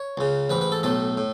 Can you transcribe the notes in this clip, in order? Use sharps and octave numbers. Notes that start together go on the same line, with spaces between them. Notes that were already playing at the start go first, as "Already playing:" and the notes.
Already playing: C#5
C#2 C#3
A1 G#2 B4
B4
A4
B1 A2 A4
A2